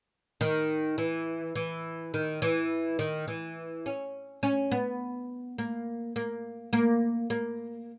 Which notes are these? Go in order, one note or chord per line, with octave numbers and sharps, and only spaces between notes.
D#3
E3
E3
D#3
E3
D#3
E3
C#4
C#4
B3
A#3
A#3
A#3
A#3